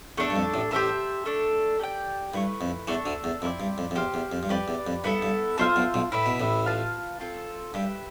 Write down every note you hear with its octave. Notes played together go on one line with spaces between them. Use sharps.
E2 A3 D4 A4
G2
F2
A1 A2
A1 A2 G4 C5 E5 A5
A3 D4 A4
G4 D5 G5
G2 A3 E4 B4
F2
E2 E3 A3 D4 A4
D2 D3
E2
F2 C4 E4 A4 D5
G2
F2
F2
E2 G4 C5 F5
E2
F2
G2
F2 G4 B4 D5
E2
F2
G2 B3 E4 A4
G2
B1 B2 F4 C5 E5 A5
B1 B2
B1 B2
A2 E4 B4 E5
B2
A1 A2
F4 B4 F5 A5
C4 F4 A4
G2 G4 B4 E5